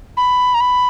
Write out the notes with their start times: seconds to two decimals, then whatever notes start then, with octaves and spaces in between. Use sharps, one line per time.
0.17 B5
0.54 A#5
0.60 B5